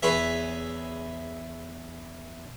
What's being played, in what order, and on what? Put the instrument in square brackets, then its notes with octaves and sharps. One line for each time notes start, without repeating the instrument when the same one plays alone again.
[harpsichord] E2 E4 G#4 B4 C#5 E5